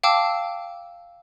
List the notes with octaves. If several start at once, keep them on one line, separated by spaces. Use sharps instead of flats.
F5 G5 A5 D6 E6